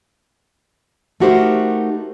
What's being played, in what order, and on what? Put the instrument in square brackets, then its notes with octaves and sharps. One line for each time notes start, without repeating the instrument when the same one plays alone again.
[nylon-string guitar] A3 D#4 F#4 G4 A#4 C5